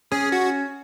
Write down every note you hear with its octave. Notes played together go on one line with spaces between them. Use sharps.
C#4 G#4
F#4